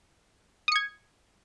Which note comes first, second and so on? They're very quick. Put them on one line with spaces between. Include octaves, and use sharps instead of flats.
D#6 C#7 G#6